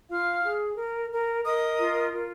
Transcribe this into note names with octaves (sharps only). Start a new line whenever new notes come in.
F4 F5 F6
G#4
A#4
A#4
A#4 D#5 D#6
F4
F4